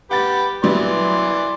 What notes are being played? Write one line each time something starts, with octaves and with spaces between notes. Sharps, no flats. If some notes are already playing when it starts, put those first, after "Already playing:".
G4 B4 F#5 A6
E3 F#3 G3 B3 D5 C6